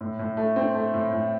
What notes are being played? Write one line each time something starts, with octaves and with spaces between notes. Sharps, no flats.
A2
A2
A3
C4
A3
A2
A2